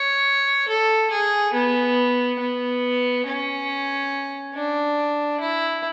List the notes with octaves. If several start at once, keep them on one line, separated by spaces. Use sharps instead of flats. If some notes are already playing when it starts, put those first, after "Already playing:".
Already playing: C#5
A4
G#4
B3
B3
C#4
D4
E4